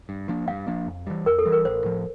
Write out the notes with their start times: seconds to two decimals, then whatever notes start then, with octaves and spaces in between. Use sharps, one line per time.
0.09 G2
0.29 F3 A#3 D4
0.48 G2 F5
0.68 F3 A#3 D4
0.87 F2
1.07 E3 G3
1.26 F2 A#4
1.38 A4
1.45 E3 G3
1.52 A#4
1.65 A1 C5
1.84 A2 F3